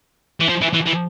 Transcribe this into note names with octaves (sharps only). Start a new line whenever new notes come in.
E3
F3
E3
E3
E3